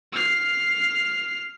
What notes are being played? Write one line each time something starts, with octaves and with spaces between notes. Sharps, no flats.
F6 C7